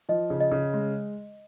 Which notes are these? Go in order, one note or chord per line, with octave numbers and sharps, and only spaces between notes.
F3 D#5
C#3
D#5
C#3
G#3